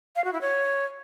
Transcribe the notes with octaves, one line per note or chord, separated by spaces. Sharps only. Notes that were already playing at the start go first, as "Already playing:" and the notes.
F5
F#4
E4
C#5